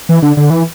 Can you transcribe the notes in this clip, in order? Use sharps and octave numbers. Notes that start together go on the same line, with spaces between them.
E3
D3
D3
E3